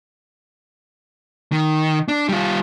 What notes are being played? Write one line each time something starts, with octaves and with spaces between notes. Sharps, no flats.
D#3
D4
G3 F4